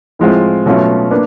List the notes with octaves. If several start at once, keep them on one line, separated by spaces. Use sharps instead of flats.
A2 F3 G#3 C4 F4
B2 F#3 A3 C#4 F4
A#3 D4 B4